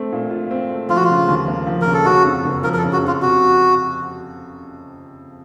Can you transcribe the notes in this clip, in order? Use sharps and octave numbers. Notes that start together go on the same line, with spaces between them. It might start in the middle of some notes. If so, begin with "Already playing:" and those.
Already playing: A3 C4
A#2
F4
C4
A3
F3 F4
F#4
F4
C#3
D#2
A#3
F3
C#3 A#4
A4
C#3 F#4
F2
F#1
F3 A#4
A#4
A4
C#3
F#4
F2 F4
C3 F#4